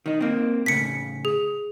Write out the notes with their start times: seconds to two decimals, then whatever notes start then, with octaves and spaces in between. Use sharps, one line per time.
0.06 D#3 D#4
0.21 A#3 C4
0.66 A2 C#3 B6 C#7
1.25 G#4